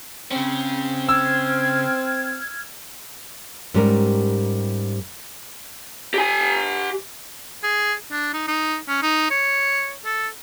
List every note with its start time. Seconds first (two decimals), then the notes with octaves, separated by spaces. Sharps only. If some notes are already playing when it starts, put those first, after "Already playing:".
0.31 C#3 C4 C#4
1.09 E6 F6 G#6
3.74 G#2 G3 C#4 G4 A#4
6.14 G4 G#5
7.63 G#4
8.12 D4
8.33 D#4
8.48 D#4
8.88 C#4
9.02 D#4
9.31 C#5
10.05 A4